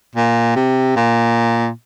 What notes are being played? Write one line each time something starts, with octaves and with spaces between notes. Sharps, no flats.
A#2
C3
A#2